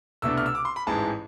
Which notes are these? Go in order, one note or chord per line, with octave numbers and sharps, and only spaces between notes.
C2 B2 A3 D4 E6
F6
E6
D6
C6
B5
A1 G#2 E3 G#3 A5